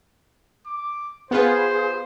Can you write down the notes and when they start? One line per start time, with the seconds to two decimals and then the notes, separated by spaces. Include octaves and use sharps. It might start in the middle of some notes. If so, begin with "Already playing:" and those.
0.66 D6
1.31 B3 F4 G#4 B4 C5